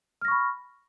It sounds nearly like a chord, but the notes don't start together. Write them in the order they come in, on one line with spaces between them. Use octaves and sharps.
F6 A#6 C#6 B5